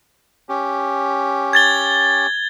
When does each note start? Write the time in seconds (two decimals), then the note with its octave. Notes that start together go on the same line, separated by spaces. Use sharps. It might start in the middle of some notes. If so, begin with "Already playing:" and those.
0.49 C#4 G4
1.53 G#6 A6 G7